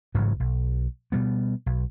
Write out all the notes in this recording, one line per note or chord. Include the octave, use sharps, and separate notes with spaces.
A1 G#2 C#3 F#3
B1
B2 G3 B3
B1